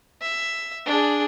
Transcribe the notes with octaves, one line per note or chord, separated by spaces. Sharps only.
E5
D4 G#4